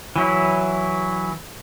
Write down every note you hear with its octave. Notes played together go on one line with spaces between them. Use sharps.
E3 F#3 E4